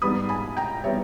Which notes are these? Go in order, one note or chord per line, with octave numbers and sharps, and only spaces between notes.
G#2 G3 B3 B5 D#6
G#5 B5
G5 A#5
G3 B3 C#5 E5